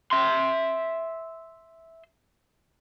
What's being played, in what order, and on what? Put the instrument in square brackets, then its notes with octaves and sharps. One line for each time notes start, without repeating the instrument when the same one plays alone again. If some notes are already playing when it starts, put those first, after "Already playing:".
[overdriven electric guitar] E5 C6